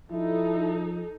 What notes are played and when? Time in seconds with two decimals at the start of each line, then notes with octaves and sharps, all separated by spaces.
0.11 F3 D#4 E4 A4